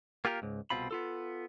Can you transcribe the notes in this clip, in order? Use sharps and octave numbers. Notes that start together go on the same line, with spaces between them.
A#3 F4 G4 G#4 A#4
C#2 G#2
C2 B2 C4 F4 B5
B3 F4 A4